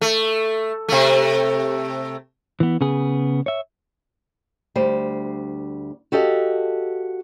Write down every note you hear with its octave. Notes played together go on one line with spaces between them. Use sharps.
A3
C3 A3
E3 B3
C#3 B3 G#4
C#5 E5
D2 G3 C5
F#4 G4 A4 D#5 F5